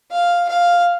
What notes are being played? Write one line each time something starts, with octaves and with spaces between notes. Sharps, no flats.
F5
F5